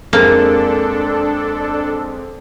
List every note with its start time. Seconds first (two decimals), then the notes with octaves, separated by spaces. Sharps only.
0.13 F2 G#3 A#3 D4 A4